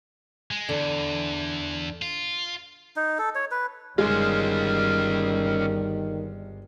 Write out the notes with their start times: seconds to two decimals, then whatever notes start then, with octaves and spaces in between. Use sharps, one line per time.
0.51 G#3
0.69 E2 D3
2.02 F4
2.96 D#4
3.18 A4
3.35 C#5
3.51 B4
3.98 G1 D#3 G3 G#3 C#4 F4